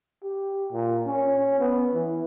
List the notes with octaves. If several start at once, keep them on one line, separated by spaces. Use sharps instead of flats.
G4
A#2
C#4
B3
E3